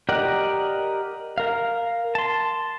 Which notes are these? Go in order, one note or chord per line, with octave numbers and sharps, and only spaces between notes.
G4 A#4 D5 D#5 F#5
A#4 F5
A5 C6